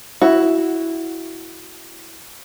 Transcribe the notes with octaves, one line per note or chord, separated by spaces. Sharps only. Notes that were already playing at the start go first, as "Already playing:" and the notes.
E4 F#4